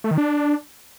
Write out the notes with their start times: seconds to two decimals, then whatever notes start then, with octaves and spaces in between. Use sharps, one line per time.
0.04 A3
0.11 D#3
0.18 D4